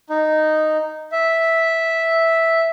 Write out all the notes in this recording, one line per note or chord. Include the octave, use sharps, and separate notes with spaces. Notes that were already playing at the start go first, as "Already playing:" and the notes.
D#4
E5